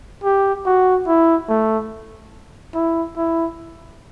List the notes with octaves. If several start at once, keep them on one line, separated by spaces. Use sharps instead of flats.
G4
F#4
E4
A3
E4
E4